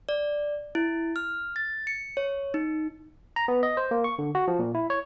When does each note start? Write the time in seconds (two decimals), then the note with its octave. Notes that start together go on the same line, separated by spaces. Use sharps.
0.09 D5
0.75 E4
1.16 F6
1.56 A6
1.87 C#7
2.17 C#5
2.54 D#4
3.36 A#5
3.48 B3
3.63 D#5
3.77 C5
3.91 A#3
4.04 C#6
4.19 D3
4.35 F#4
4.48 F3
4.59 A#2
4.75 E4
4.90 C#5